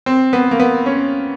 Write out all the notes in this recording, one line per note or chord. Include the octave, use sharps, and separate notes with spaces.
C4
B3
A#3
B3
C#4